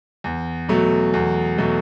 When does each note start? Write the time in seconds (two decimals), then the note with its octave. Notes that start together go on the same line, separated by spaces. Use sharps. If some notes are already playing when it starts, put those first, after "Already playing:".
0.24 E2
0.68 B2 F#3 A3
1.14 E2
1.58 B2 F#3 A3